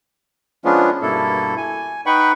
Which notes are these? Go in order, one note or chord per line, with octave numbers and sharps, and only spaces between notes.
F3 G#3 B3 C#4 D4 F4
G2 B2 A#3 E4 A4
G#5
D#4 B4 F#5 G5 B5 C#6